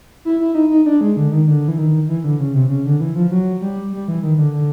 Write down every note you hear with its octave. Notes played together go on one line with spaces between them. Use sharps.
E4
E4
D#4
D#4
D4
G#3
D3
D#3
D3
E3
D#3
E3
D3
C#3
C3
C#3
D3
E3
F3
F#3
G3
G3
E3
D#3
D3
D3